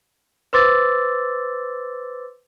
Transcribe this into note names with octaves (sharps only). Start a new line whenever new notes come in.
B4 C5 C6 D6 E6 A6